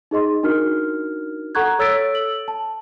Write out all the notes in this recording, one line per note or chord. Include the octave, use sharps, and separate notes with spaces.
D#4 G#4 D#5 C6
D4 D#4 F#4 A#4 F6
A4 F#5 A#5 C#6 F#6 G#6
A4 C#5 E6 A6 B6 D7
F#7
A5